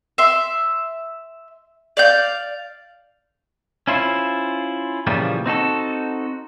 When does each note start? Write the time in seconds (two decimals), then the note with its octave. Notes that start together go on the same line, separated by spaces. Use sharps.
0.18 E5 C6
1.97 D5 F5 G6
3.87 C#4 E4 F4 C5
5.07 A#2 C#3 E3 F3 G3
5.46 C4 D#4 F#4 A4